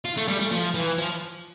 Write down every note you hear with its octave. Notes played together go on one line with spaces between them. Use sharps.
F4
A3
G3
A3
F3
E3
F3